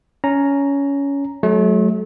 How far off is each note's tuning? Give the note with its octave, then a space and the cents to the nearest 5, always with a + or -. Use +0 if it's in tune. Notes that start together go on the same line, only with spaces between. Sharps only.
C#4 +15 A#5 +0
F#3 +5 A3 -35